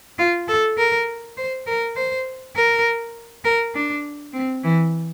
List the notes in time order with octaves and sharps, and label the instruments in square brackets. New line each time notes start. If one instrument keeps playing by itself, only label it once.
[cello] F4
A4
A#4
C5
A#4
C5
A#4
A#4
D4
C4
E3